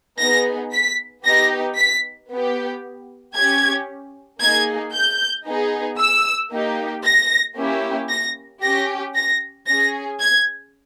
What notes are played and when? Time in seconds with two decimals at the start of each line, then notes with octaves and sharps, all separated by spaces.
0.19 B3 D#4 G#4 A#6
0.72 B6
1.24 B3 D#4 G4 A#6
1.77 B6
2.30 B3 G4
3.35 C#4 G4 G#6
4.40 A#3 D#4 G#4 G#6
4.93 G6
5.46 B3 D#4 G#4
5.98 E6
6.51 A#3 D#4 G4
7.04 A#6
7.56 A#3 C#4 E4 G4
8.09 A#6
8.62 C#4 G4 A#6
9.15 A#6
9.67 C#4 G#4 A#6
10.20 G#6